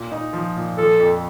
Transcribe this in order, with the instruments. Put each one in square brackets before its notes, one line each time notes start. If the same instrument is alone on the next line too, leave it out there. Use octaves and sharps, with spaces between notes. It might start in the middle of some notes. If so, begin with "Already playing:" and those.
Already playing: [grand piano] A#2
D#4
F3
A#2
[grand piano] F3 [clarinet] A4
[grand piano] F2